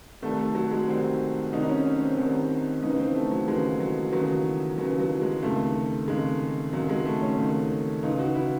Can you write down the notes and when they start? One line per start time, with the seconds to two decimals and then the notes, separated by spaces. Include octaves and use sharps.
0.22 C2 C3 D#3 A3
0.39 A3
0.55 F#3
0.71 G#3
0.87 C2 C3 D#3 C4
1.52 C2 C3 D#3 D#4
1.63 D#4
1.69 C#4
1.85 C#4
2.02 C4
2.18 C2 C3 D#3
2.83 D#2 C#3 E3 D#4
2.99 C4
3.15 A3
3.31 F#3
3.48 D#2 C#3 E3 G#3
3.80 F#3
4.13 D#2 C#3 E3 F#3
4.78 D#2 C#3 E3 F#3
4.99 F#3
5.21 G#3
5.43 C#2 C3 D#3 A3
6.08 C#2 C3 D#3 G#3
6.73 C#2 C3 D#3 F#3
6.89 G#3
7.05 A3
7.22 C#4
7.38 C#2 C3 D#3
8.03 C#2 C#3 E3 D#4
8.19 F#4
8.35 E4